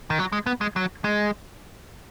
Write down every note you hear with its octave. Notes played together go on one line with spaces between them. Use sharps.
D#3
F#3
G#3
B3
G#3
F#3
G#3